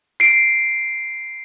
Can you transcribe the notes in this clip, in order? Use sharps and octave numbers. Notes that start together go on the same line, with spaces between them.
C7 D7